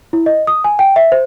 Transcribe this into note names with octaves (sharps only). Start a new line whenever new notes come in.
E4
D#5
D#6
G#5
G5
E5
C5